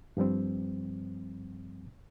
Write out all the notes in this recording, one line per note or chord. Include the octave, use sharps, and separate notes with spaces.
G2 F3 G3 C4